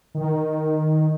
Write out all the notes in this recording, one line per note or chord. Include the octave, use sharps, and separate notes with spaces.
D#3